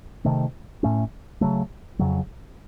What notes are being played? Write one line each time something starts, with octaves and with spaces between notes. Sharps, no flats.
C3 D#3 A3
A2 A3 C#4
C#3 F#3 A3
F2 C#3 F#3